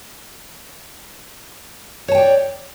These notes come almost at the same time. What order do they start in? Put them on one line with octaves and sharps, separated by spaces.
C#5 A5 G5 D5